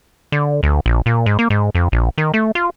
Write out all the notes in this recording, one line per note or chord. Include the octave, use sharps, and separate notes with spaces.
D3
D2
A#1
A#2
G#2
A#3
G#2
F2
A#1
D#3
A3
F4